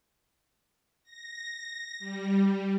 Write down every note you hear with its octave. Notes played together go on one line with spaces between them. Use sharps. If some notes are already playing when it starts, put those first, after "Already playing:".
A#6
G3